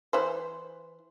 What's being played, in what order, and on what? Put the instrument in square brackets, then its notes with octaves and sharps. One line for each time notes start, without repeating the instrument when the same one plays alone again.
[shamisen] E3 B4 C5